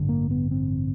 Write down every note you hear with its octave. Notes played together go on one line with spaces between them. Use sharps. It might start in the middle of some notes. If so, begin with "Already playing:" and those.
Already playing: A1 G2 D3
A#3
B3
C4